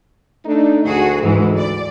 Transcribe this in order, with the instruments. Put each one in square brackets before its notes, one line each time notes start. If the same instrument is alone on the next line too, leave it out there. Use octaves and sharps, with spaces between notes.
[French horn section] A3 D4 D#4
[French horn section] D2 [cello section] F#4 G#4
[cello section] G#2 E3 G#3
D5